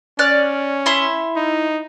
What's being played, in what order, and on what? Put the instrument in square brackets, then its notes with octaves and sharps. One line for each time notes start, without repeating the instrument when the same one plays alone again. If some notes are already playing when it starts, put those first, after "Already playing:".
[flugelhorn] C#4 [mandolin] D5 F6 F#6
[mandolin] E4 E5 C6
[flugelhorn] D#4